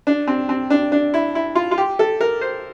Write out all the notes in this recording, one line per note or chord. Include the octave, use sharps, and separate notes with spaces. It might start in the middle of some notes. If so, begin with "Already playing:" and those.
D4
C4
C4
D4
D4
E4
E4
F4
F4
G4
A4
A#4
C5